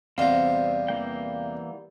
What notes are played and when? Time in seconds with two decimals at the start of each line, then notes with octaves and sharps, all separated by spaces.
0.18 E2 C3 G3 B3 C4 F5 A#5
0.88 E3 A#3 G5